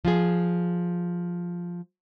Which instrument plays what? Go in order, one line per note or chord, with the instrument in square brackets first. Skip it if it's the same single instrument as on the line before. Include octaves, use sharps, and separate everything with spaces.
[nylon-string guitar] F3 F4 G#4